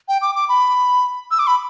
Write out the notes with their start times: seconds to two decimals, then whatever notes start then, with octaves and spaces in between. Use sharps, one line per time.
0.08 G5
0.22 D6
0.35 D6
0.49 B5
1.31 E6
1.39 D6
1.47 B5